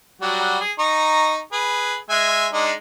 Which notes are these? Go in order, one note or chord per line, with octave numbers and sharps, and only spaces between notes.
F#3 G3 F#4
G#4
D#4 A#5 C#6
G#4 B4
G#3 E5 G#5
G#3 D4 D#4